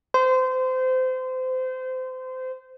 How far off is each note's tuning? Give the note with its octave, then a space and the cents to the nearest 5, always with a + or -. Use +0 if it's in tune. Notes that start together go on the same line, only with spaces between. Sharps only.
C5 -25